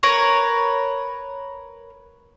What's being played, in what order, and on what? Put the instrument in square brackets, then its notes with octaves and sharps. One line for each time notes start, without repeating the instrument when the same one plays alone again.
[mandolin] A#4 B4 C#5